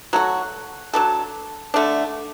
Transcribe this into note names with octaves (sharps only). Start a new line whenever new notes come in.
F#3 A3 F#4
F#3 D4 A4
D3 A3 D4